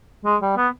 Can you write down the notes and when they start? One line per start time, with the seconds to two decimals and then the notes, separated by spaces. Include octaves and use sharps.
0.25 G#3
0.41 G3
0.57 B3